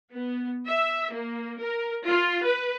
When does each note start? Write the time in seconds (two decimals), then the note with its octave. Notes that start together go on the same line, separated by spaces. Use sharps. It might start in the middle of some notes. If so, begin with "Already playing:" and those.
0.14 B3
0.67 E5
1.14 A#3
1.60 A#4
2.07 F4
2.44 B4